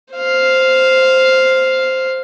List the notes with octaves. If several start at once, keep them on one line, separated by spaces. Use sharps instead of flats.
C5 F5